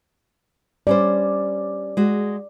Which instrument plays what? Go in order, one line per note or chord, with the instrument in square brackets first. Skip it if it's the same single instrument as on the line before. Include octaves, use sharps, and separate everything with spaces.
[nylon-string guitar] G3 C#4 C5 [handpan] D5
[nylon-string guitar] G#3 F#4